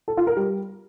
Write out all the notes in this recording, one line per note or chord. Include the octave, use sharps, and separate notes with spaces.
A4
F4
A#4
G3